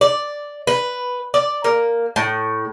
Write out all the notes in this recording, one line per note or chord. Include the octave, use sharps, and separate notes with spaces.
D5
B4
D5
A#3
A2